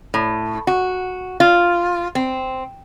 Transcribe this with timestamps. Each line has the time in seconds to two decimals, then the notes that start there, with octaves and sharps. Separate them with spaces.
0.14 A2
0.67 F#4
1.40 F4
2.15 C4